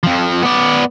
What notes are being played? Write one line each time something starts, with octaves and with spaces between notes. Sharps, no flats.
F2 F3
B3 D5